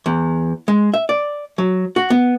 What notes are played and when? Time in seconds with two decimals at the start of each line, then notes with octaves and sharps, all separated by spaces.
0.06 E2
0.68 G#3
0.94 E5
1.09 D5
1.58 F#3
1.96 F#4
2.10 B3